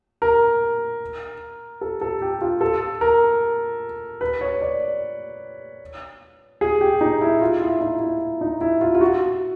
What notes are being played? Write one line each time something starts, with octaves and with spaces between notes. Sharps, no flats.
A#4
A4
A4
G4
F4
A4
A#4
B4
C#5
D5
G#4
G4
D#4
E4
F4
E4
D#4
E4
D#4
E4
F4
F4
F#4